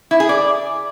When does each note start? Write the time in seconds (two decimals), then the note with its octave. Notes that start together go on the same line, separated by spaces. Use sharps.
0.11 E4
0.20 G#4
0.29 D5